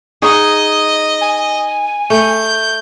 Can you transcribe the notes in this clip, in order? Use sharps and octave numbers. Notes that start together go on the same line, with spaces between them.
D#4 F#4 G#4 D#5
G#5
A3 G6